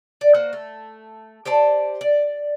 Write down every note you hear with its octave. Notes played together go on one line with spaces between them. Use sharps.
D5
A#3 F#4 C5
A3
G4 C5 D5 A5
D5